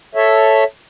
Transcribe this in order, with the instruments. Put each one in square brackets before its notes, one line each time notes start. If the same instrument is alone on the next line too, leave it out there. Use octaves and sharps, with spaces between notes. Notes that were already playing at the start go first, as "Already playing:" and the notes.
[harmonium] A4 C#5 E5